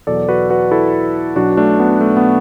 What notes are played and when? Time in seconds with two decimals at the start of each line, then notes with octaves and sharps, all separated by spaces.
0.07 E2 B2 F#3 A4 D5
0.29 F#4 B4
0.50 F#4 B4
0.71 E4 A4
1.36 B1 B2 F#3 D4 F#4
1.57 A3 D4
1.80 B3
2.01 A3
2.17 B3